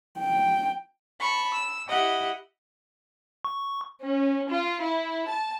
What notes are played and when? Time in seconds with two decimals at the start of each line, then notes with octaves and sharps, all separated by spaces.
0.20 G5
1.19 A5 B5 C#6
1.54 E6
1.88 E4 G4 D#5 F#5
3.45 C#6
4.01 C#4
4.47 F4
4.79 E4
5.26 A5